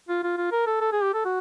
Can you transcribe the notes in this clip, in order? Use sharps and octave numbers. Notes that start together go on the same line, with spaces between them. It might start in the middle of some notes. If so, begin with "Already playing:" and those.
F4
F4
F4
A#4
A4
A4
G#4
G4
A4
F#4